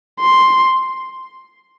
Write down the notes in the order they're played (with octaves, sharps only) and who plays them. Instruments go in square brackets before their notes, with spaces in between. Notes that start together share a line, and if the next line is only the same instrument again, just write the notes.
[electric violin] C6